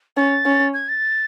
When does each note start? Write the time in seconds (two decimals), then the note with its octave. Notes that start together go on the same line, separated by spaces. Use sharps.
0.17 C#4 A6
0.45 C#4
0.74 G#6
0.89 A6